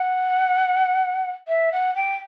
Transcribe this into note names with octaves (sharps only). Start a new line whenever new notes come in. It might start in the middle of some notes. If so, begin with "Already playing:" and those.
Already playing: F#5
E5
F#5
G5